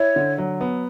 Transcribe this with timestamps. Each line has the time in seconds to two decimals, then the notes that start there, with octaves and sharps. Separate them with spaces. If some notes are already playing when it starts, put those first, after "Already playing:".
Already playing: E4 C#5
0.16 D3
0.38 F#3
0.61 B3